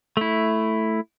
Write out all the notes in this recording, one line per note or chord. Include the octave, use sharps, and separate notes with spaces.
A3 E4